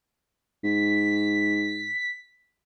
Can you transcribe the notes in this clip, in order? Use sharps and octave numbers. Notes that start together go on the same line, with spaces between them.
G#2 B6